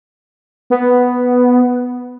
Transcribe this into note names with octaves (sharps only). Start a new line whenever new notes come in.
B3